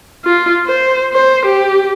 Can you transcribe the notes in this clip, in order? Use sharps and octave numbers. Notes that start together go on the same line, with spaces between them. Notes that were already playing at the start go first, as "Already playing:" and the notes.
F4
C5
C5
G4